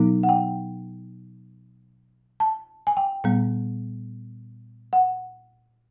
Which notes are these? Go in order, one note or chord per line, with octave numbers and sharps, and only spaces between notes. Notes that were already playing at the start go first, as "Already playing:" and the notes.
Already playing: B2 F#3 B3 D#4
F#5
G5
A5
G#5
G5
A#2 G3 B3
F#5